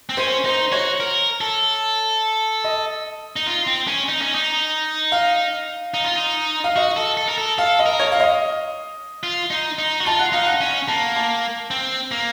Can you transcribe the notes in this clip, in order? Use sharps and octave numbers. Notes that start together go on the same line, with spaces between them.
C4
C#4 C5
D#4 C5
F#4 C#5
A#4
A4
D#5
D#4
F4
C4
C#4
D#4
C#4
D#4
F5
D#4
F4
D#4
F5
F#4 D#5
A4
A4
A#4
A4
A4 F5
D#5
A#4
C#5
F5
D#5
F4
D#4
D#4
F#4
F4 A5
F#5
D#4 F5
F#5
C#4
A#3 A5
A5
C4
A#3